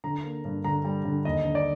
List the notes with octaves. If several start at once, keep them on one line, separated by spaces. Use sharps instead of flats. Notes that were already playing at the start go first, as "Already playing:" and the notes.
D3 A#5
A#3
G2
D3 A#5
G3
D3
D#2 D#5
D3
D5